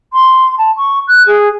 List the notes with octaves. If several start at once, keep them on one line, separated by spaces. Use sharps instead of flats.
C6
A5
C#6
F#6
G#4